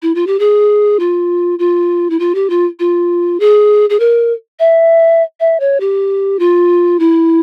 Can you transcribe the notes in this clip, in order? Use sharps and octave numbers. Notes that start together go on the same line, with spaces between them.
E4
F4
G4
G#4
F4
F4
E4
F4
G4
F4
F4
G#4
G#4
A#4
E5
E5
C#5
G4
F4
E4